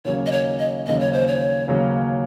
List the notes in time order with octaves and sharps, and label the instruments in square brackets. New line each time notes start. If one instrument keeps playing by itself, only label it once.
[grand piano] D#2 C#3 F#3 A#3 C#4 [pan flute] C#5
[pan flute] D#5
C#5
D#5
[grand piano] D#2 C#3 F#3 A#3 C#4 [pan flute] D#5
[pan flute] C#5
C5
C#5
[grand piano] D#2 C#3 F#3 A#3 C#4